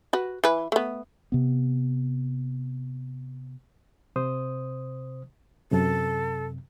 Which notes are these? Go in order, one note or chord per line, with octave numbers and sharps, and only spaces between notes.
F#4 B4
E3 B4
A3 B3
C3 B3
C3 C5 D#6
F#2 C3 A4